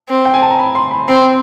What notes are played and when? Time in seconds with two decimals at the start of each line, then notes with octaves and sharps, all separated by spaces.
0.09 C4
0.25 G5
0.34 G#5
0.42 A5
0.50 A#5
0.59 B5
0.75 C6
0.91 B5
1.08 C4 C6